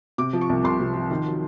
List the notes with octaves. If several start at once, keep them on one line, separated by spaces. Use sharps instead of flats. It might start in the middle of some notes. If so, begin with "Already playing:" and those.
C3 D6
F3
C#6
C2
C2 C6
C3
F3
D#3
F#3